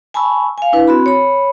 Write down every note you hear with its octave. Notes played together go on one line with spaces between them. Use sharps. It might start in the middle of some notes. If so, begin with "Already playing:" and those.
G#5 A5 B5 C#6 E6
F5 G#5
D4 E4 B4
C4 F#4 B5
C#5 B5